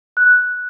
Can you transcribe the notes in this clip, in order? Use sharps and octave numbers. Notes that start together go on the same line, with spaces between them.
F#6